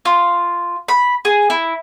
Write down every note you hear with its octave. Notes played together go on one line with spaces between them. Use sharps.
F4
B5
G#4
E4